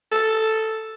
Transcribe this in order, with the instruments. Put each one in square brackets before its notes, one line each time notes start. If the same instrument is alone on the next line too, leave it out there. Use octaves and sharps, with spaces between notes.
[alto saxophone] A4